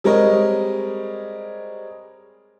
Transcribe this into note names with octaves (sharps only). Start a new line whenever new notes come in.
G3 G#3 C4 A#4 C#5 D#5